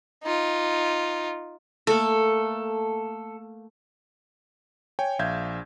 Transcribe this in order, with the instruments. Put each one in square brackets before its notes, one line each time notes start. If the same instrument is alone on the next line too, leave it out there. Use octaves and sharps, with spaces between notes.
[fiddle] D#4 F4
[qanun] A3 A#3 [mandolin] A4
[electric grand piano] C#5 G5 G#5
A#1 E5 F5 G6 G#6